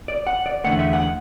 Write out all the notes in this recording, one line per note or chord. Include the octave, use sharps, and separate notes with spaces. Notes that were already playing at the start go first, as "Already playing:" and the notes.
D5
F#5
D5
E2 D3 A3 F#5
E5
F#5